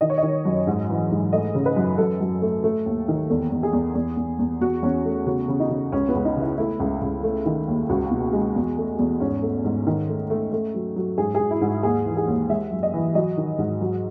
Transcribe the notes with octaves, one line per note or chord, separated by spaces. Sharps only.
D#3 D#5
C#5
D#5
D#3
F#2
G#2
E3
G#2
A3 D#5
C#3
B4
F#2
F#2 A4
F#2
A3
A3
D#2
D#3
E2 A4
E2
G#4
E2
E2
E2
E2
E2 F#4
E2 C#4
A3
C#3 F#4
C#3
D#4
C#3
C#2 C#4
B3
C#2
D#4
C#3 E4
A3 E4
C#2
C#2
A3
D#3
D#2
C#2 F#4
B2
G#3
E2
A3
E2
G#2 C#4
A3
G#2
D#3
A3
A3
A3
F#3
F#3
G#2 G#4
G#4
G#2
E4
G#2
F#4
D#2 G#4
E3
G#4
D#2
G#3 E5
F#2
D#5
E3
F#3 D#5
D#3
G#2
F#3